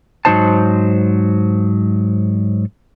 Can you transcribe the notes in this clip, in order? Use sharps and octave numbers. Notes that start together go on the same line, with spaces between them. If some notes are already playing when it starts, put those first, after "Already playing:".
G#2 F#3 G#3 D#4 C5 A5